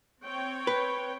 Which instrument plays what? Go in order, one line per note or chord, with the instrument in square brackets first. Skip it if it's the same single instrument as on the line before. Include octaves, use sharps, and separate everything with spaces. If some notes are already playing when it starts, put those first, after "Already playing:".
[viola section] C4 C#5 G5
[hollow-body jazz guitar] B4